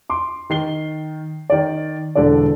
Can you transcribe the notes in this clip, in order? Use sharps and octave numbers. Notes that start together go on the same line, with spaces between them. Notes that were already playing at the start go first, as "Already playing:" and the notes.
C6 D6
D#3 C7 G7
D#3 D5
E1 D3 A4 D5